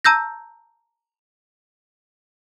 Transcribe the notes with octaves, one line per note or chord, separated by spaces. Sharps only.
A5 A#5 E6 G6 A#6